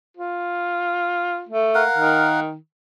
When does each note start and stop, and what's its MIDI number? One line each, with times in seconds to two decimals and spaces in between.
0.17 1.44 65
1.49 1.83 57
1.75 2.40 70
1.75 2.40 77
1.75 2.40 78
1.97 2.55 51